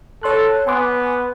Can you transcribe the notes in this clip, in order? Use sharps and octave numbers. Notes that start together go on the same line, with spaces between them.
A4 C#5 C6 F#6
B3 G#5 C6 D6